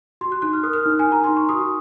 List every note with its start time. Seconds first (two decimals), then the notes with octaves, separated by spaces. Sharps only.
0.21 F#4 C6
0.32 F#6
0.42 D#4 F#6
0.53 F6
0.63 A#4 D#6
0.73 F6
0.86 D#4
0.99 G#5
1.06 D#4
1.12 A#5
1.24 D#4 C6
1.37 C#6
1.49 F#4 D#6